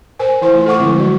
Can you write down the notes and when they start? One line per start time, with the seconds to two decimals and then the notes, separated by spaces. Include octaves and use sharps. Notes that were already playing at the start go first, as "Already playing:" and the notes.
0.19 A#4 C5 G#5
0.42 E3 E4 C5 C6
0.54 A3 F4
0.66 A4 F#5 C#6 D6
0.79 D3 F3 G#3 C4 E4
0.98 F#3 F#4